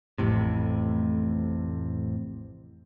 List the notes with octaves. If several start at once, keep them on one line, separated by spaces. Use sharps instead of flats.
A1 F2 A2 C3